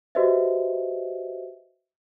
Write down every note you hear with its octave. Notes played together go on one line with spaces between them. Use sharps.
F#4 G4 B4 C5 D#5 E5